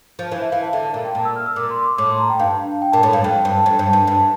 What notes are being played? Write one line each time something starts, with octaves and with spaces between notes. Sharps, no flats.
F3
E3 F5
E5
E3 F5
A5
D3 E5
E5
A#2 F5
G5
A#2 A5
E6
F6
E6
A#2 D6
C6
D6
A2 D6
C6
A#5
G5
G2 F5
G5
A#2 A5
A2 A5
G2 F5
F2 G5
G2
F2
G2
G2
G2